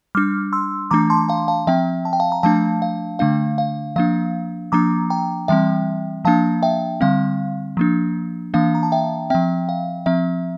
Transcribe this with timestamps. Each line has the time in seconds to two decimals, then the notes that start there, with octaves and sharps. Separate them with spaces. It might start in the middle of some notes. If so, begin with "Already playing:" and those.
0.15 G3 D4 D6 F6
0.53 C6 E6
0.91 E3 A3 D4 A#5 D6
1.10 A5 C6
1.28 F5 A5
1.48 F5 A5
1.67 F3 C4 E5 G5
2.05 A5
2.13 G5
2.20 F5 A5
2.32 A#5
2.43 F3 A3 D4 F5 A5
2.82 F5
3.19 D3 A3 D4 F5
3.58 F5
3.96 F3 A#3 D4 F5
4.72 F3 A#3 D4 A#5 D6
5.10 G5 A#5
5.48 E3 G3 C4 E5 G5
6.25 F3 A#3 D4 F5 A5
6.63 E5 G5
7.01 D3 G3 C4 F5
7.77 F3 A#3 D4
8.54 E3 A#3 D4 F5
8.75 A#5
8.83 A5
8.92 E5 G5
9.30 F3 C4 E5 G5
9.69 F5
10.06 F3 C4 E5